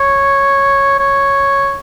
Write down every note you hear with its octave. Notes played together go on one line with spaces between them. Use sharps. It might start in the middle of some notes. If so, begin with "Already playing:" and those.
Already playing: C#5
C#5